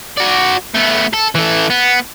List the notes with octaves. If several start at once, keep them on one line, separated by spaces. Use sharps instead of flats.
F#4 D5
A3 B3
A4
E3 A4
B3